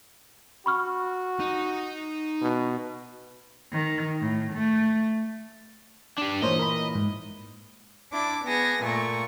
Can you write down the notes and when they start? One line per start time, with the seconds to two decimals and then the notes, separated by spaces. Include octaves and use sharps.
0.66 F#4 B5 C#6 F6
1.40 D#4
2.42 B2
3.72 D#3
4.21 A2
4.53 A3
6.18 D4 G4
6.42 A#2 E3 A#4 C5 C#5 D#5
6.59 A#4 B5
6.95 G#2
8.11 D4 E4 D6
8.44 B3 G#4 A#6
8.83 A#2 A3 C#6